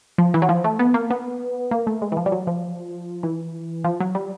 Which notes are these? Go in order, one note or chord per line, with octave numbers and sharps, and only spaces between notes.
F3
E3
F#3
F3
A3
B3
A#3
B3
A#3
A3
G#3
E3
F3
G3
F#3
F3
E3
F3
F#3
G3